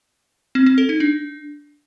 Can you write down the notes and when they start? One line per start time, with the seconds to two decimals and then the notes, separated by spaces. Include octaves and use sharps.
0.55 C4
0.66 C4
0.78 A4
0.89 D#4
1.00 D4